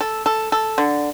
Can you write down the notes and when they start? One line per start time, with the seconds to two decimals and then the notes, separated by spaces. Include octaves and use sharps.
0.01 A4
0.26 A4
0.52 A4
0.78 D3